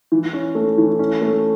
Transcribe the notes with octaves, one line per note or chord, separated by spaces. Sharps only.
E3
C#4
A3
E3
C#4
A3